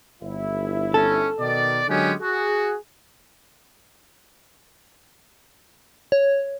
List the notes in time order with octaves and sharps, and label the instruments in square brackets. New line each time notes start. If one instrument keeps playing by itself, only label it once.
[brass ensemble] G1 E4
[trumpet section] C#4 [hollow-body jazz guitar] A4
[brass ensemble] B2 D#3 [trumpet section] D5
[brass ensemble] D3 F#3 G#3 [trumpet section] B3 C#4 G4
[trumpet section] F#4 [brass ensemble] G#4
[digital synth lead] C#5